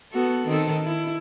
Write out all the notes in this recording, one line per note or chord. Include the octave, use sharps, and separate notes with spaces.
B3 F#4 A4
D#3 C4 A4
E4